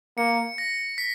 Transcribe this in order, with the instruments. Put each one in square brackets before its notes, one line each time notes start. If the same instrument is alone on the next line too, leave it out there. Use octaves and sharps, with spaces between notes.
[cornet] A#3 [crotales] C#7
[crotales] A#6
B6